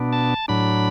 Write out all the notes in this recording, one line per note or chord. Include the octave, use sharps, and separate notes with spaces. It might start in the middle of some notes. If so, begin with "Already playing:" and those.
Already playing: B2 B3 D4
A5
A2 F#3 D4 B5